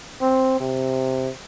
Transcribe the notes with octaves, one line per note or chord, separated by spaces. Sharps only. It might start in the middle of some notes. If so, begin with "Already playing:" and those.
C4
C3